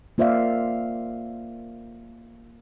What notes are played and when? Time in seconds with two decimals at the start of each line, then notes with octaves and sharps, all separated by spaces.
0.18 A#3 F4 C5 D5 E5 F5